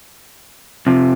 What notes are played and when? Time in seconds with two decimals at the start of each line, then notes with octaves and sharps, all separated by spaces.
0.87 F2 C3 F3